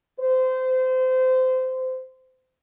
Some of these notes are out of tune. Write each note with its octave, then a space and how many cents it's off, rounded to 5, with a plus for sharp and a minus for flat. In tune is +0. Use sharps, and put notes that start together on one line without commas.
C5 -25